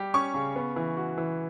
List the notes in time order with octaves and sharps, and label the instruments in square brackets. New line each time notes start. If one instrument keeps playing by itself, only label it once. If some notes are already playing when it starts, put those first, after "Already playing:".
Already playing: [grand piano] G3 G4
[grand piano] C#4 [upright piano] C#6
[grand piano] C#3
B3
E3
F#4
E3